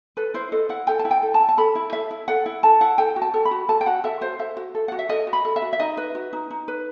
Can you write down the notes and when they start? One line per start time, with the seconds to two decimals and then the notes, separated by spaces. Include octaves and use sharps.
0.17 A4 B4
0.34 E4 C5
0.52 A4 D#5
0.69 E4 F#5
0.87 A4 G5
0.99 A5
1.05 E4
1.11 G5
1.22 A4
1.34 A5
1.40 E4
1.49 A5
1.58 A4 B5
1.75 E4
1.93 A4 E5
2.11 E4
2.28 A4 F#5
2.46 E4
2.63 A4 A5
2.81 E4 F#5
2.98 A4 G5
3.16 F#4
3.22 A5
3.34 A4
3.45 B5
3.51 F#4
3.68 A4 A5
3.81 G5
3.86 F#4 F#5
4.04 A4 E5
4.21 F#4 C5
4.39 A4 E5
4.57 F#4
4.75 A4
4.88 F#4 F#5
4.99 E5
5.09 A4 D#5
5.27 F#4
5.33 B5
5.45 A4
5.56 E5
5.62 F#4
5.73 E5
5.79 D#4 D#5
5.97 B4
6.15 F#4
6.33 D#4
6.50 D#4
6.68 B4